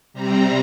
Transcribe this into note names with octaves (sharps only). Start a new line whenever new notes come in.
C3 G3 C4 A#5